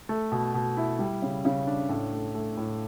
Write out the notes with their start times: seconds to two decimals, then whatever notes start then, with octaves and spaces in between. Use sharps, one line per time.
0.09 A3
0.32 B2
0.54 B2
0.77 E4
0.99 G3
1.22 C#3
1.45 C#3
1.67 D4
1.89 A2
2.13 A3
2.35 A3
2.57 A2